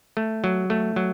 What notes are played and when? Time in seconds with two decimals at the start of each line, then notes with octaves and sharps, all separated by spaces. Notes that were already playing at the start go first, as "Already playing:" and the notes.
0.17 A3
0.44 F#3
0.70 A3
0.96 F#3